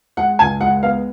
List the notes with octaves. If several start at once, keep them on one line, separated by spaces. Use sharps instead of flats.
G#3 F#5
C#2 G#5
G#3 F#5
B3 F5